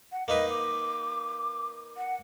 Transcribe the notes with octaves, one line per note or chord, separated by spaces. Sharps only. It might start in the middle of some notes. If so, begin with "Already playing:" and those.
F#5
A#3 D#4 B4 D#5
D6
F#5